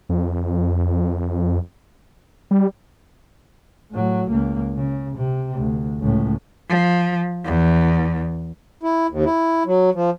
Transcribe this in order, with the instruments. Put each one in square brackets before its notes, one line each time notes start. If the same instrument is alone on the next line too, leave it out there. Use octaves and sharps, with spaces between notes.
[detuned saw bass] F2
G3
[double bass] A2 F#3
C#2 A#3
C#3
C3
D2
C#2 A2
[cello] F3
E2
[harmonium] E4
D#2
E4
F#3
F3